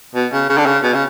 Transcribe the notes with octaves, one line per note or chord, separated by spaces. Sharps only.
B2
C#3
C#3
D3
C#3
B2
C#3